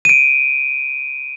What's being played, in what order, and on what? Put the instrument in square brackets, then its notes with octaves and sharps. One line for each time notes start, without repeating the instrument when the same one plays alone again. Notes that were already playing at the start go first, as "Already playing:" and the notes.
[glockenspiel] D7 D#7